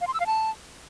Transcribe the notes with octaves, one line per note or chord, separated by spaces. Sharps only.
F5
C6
E6
F5
A5